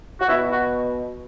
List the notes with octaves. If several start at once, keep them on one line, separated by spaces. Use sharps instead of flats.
F#4
B2 E4
F#4